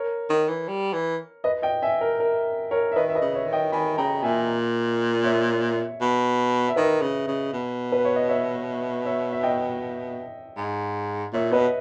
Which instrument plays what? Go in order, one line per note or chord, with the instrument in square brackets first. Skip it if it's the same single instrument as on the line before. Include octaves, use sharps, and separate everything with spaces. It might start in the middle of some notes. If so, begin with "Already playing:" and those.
Already playing: [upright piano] A#4 C#5
[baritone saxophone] D#3
E3
G3
E3
[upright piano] B4 D#5
D#5 G5
E5 G#5
A#4
A#4
A#4 C#5
E5
[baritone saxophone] D#3 [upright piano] B4 D#5
[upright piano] E5
B4 D#5
[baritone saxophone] C#3
[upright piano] C#5 E5
[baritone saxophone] D#3
[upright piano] D#5 G5
[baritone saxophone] D#3 [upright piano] G#5 B5
[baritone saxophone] C#3 [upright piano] G5 A#5
[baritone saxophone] A#2 [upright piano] E5 G#5
[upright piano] C#5 E5
[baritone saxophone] B2
[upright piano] E5
[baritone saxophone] D#3 [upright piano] B4 D#5
[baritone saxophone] C#3
C#3
B2
[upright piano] B4
C#5
D#5
C#5 E5
C#5 E5
E5
D#5 G5
[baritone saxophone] G#2
[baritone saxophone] A#2 [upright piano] C#5 E5
[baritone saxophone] B2 [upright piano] B4 D#5